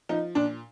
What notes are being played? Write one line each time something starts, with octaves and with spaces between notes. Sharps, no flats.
F3 D#4
A#2 D4